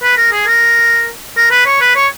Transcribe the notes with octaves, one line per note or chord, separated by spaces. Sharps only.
B4
A#4
G#4
A#4
A#4
B4
C#5
B4
C#5